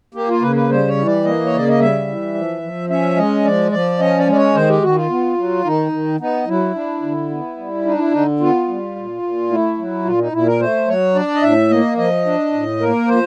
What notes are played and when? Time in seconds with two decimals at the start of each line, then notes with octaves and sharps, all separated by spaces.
0.14 A#3 G4
0.29 F4
0.42 C#3 B4
0.56 B4
0.70 G3 C5
0.88 C#5
0.97 E3
1.06 D5
1.25 A#3 D#5
1.46 C#5
1.53 C#3 D5
1.69 D#5
1.79 G3 E5
2.07 E3
2.34 F3
2.62 F3
2.90 C#4 E5
3.17 G#3 D#5
3.45 F3 D5
3.72 F3 D5
3.99 C#4 D#5
4.19 D5
4.27 G#3
4.32 D5
4.37 C#5
4.55 D#3 C5
4.69 G4
4.82 D#3 F#4
4.96 F4
5.10 B3
5.37 F#3
5.64 D#3 D#4
5.92 D#3
6.20 B3 D#4
6.47 F#3 E4
6.74 D4
7.02 D3
7.30 B3
7.57 G3
7.85 D4 D#4
7.98 E4
8.12 D3 D#4
8.40 B3 F4
8.68 G3
8.95 A#2
9.22 A#2
9.50 A3 E4
9.78 F#3
10.05 A#2 F4
10.19 D#4
10.32 A#2 E4
10.46 A#4
10.60 A3 C5
10.88 F#3 C#5
11.15 D4 D5
11.35 D#5
11.42 A2 E5
11.70 A#3 D#5
11.97 F3 D#5
12.26 D4
12.53 A2
12.80 A#3 A#4
13.08 F3 C5